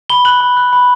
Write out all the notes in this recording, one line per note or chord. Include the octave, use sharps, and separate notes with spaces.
B5 G7
F#6 F#7
B5
F#6
B5